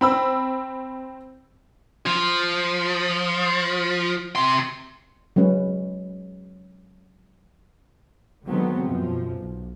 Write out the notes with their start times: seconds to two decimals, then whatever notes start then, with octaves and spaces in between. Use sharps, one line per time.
0.01 C4 B5 E6
2.06 F3
4.36 C3 C6
5.36 F#3 G#3 C#4 B4
8.45 D3 D#3 F#3 G#3 B3 C4
8.86 F#2 B2 F3
9.34 B1